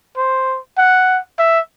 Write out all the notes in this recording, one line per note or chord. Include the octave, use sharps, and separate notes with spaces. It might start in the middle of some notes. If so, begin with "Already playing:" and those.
C5
F#5
E5